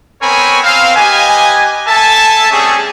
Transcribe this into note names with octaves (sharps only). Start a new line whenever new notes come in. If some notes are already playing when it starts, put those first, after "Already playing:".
B3 C4 A#4 C#5 G#5 B5
C4 F5
G4 B4 D#5 G#5
A4 E5 G#5 A5
G3 A3 C4 C#4 G#4